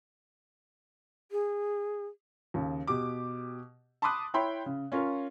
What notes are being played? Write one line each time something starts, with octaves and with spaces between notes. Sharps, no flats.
G#4
D#2 C#3
B2 G4 D6
A5 B5 C6 D6 D#6 F#6
E4 C#5 G5 B5 C6
C#3
C#4 F4 A#4 C#5